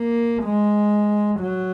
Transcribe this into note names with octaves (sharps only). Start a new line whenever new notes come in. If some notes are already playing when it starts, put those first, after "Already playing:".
Already playing: A#3
G#3
F#3